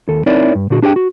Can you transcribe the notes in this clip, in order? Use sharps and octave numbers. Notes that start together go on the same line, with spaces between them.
D#2 A4
C4 D#4 E4 A#4 C#5 D5
G2
A#2 D3 F#4 G#4
D4 G4 G#4 C#5 G5
F#4